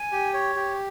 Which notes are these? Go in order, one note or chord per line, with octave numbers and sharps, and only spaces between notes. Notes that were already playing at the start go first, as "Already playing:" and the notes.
Already playing: G#5
G4
C#5
G4